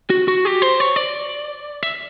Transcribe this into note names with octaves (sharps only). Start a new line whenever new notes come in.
F#4
F#4
G4
C5
C#5
D5
E5